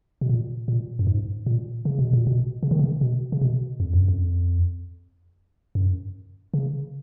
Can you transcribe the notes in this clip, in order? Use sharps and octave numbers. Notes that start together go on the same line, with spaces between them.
B2
A#2
A#2
F#2
G#2
A#2
C#3
B2
A#2
B2
C#3
D#3
C#3
B2
C#3
B2
F2
F#2
F2
F#2
C#3